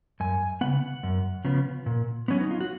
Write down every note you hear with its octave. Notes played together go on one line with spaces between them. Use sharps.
F#2 G#5
C#3 F3 B3 F#5
F#2
C#3 F3 B3
A#2
F#3 B3 C#4
D#4
F4
F#4